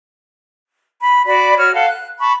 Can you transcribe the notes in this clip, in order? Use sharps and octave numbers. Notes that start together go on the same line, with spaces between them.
B5
F#4 D5 B5
F#4 C#5 F6
A4 F5 F#5
F#6
A5 B5 C#6